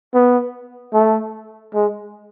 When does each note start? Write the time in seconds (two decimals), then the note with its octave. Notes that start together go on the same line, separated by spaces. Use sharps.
0.14 B3
0.93 A3
1.74 G#3